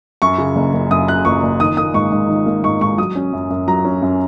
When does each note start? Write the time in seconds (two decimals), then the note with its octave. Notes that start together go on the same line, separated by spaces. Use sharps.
0.22 F#2 C#6
0.38 C#3
0.56 F#1
0.74 F#1
0.90 F#2 D#6
1.08 C#3 F#6
1.25 F#1 C#6
1.43 F#1
1.60 D#3 D#6
1.77 A#3 D#6
1.94 G#2 C#6
2.12 G#2
2.29 D#3
2.46 A#3
2.63 G#2 C#6
2.81 G#2 C#6
2.98 F#3 D#6
3.15 C#4
3.33 F#2
3.50 F#2
3.67 F#3 A#5
3.85 C#4
4.02 F#2